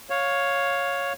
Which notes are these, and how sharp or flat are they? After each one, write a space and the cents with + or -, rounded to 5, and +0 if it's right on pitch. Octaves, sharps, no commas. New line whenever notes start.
C#5 +0 F5 +15